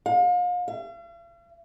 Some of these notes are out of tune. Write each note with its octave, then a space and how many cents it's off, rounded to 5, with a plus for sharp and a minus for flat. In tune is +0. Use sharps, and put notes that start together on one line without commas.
F5 +40
F5 -45